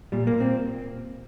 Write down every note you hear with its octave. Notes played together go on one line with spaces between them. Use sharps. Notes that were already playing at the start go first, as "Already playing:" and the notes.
A#2 G3
A#3
A#2
C4